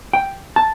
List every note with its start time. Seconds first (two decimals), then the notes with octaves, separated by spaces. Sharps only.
0.13 G5
0.56 A5